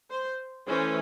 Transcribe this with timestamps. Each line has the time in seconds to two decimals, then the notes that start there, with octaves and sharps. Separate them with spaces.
0.10 C5
0.67 E3 A3 C#4 C5